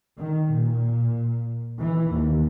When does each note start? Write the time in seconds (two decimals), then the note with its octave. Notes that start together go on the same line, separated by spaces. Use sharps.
0.18 D#3
0.52 A#2
1.80 E3
2.12 D#2